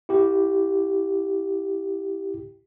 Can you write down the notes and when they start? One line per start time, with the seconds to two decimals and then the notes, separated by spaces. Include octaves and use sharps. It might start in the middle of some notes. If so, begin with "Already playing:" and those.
0.09 E4 G4